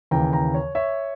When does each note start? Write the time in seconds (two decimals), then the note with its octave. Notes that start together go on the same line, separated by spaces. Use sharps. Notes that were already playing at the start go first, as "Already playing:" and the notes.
0.11 D#2 C#3 E3 G5 A#5
0.32 G5 A#5
0.54 C#5
0.75 C#5 E5